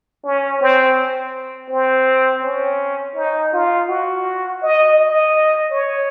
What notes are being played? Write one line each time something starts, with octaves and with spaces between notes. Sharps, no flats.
C#4
C4
C4
C#4
D#4
F4
F#4
D#5
D#5
C#5